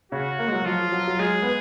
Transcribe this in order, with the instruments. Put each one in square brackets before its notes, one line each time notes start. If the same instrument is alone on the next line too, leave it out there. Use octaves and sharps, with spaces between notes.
[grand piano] C#3 [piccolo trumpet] F#4
[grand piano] A#3
G#3
F#3
[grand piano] F3 [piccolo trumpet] F4
[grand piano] F#3
F#3
[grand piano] G#3 [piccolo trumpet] G#4
[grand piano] B3